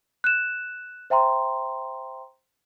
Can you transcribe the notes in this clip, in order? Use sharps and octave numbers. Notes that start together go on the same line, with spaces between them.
F#6 E7
C5 E5 G5 A#5 C6